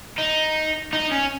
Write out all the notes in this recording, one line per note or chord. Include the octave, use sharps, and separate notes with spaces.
D#4
D#4
C#4